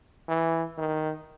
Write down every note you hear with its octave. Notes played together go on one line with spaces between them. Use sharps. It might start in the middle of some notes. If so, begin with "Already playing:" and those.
E3
D#3